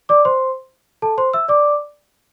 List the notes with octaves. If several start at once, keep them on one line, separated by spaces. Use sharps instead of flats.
D5 D6
C5 C6
A4 A5
C5 C6
E5 E6
D5 D6